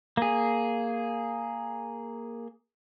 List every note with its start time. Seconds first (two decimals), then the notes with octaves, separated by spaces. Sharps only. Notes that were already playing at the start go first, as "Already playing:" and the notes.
0.17 A#3 G#4